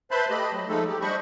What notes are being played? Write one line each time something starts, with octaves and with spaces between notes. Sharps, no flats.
B4 C5 E5 A5 B5 C6
A3 G4 D#5 B5
F#3
F3 G#3 A3 D#4 A4
G4
G3 D4 C5 D#5 B5 C#6